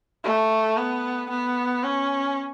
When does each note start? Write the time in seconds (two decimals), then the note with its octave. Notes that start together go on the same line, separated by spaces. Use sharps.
0.24 A3
0.77 B3
1.30 B3
1.84 C#4